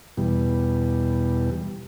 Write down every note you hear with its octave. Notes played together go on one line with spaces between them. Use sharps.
E2 B2 G3